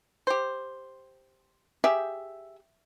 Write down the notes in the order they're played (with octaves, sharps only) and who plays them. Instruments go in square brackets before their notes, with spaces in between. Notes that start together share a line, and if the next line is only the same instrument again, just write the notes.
[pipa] G4 C5
[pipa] G4 G#4 [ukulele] E5